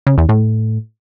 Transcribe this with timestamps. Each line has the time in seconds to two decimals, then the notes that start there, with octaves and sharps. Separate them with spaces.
0.07 C#3
0.18 E2
0.29 A2